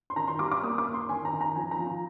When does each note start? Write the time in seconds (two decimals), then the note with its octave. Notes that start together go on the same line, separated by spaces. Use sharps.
0.10 C6
0.16 D#3 A#5
0.28 C6
0.39 G3 D6
0.52 D6
0.63 A#3 D#6
0.78 D6
0.87 A#3
0.94 C6
1.09 D#3 G#5
1.25 A#5
1.33 D#3
1.41 A#5
1.56 F3 G#5
1.71 A#5
1.79 F3